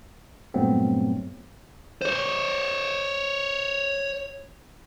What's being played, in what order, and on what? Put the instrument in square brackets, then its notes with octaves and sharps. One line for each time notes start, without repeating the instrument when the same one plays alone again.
[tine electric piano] G2 A#2 F#3 A3 B3 C4
[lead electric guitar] C5 C#5